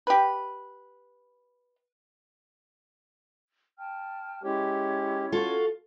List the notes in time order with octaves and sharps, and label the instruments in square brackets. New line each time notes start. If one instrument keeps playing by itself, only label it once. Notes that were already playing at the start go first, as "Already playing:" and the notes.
[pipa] G4 B4
[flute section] G5 A5 F6
[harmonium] G#3 G4 [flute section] C#4 E4 C#5
[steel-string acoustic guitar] F4 A4 [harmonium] F#4